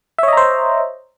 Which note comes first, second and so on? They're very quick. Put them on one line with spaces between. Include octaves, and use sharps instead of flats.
E5 C#5 D#5 A#5 C5